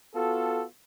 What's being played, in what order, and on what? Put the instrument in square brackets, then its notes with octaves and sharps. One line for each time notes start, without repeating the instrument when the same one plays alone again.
[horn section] B3 F4 F#4 A4